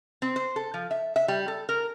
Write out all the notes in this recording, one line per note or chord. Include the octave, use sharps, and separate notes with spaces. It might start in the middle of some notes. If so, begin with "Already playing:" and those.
C4
C5
A4
F3
E5
E5
G3
A4
A#4